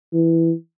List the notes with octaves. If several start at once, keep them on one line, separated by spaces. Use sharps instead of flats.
E3